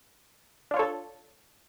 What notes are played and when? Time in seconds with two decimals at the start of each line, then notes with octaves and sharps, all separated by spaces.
0.71 D4
0.74 F4
0.76 C#5
0.79 A4